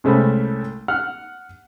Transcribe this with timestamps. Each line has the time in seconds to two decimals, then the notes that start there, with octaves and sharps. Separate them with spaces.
0.04 C2 G#3 A3 C#4 C5 B5
0.88 F#5 F6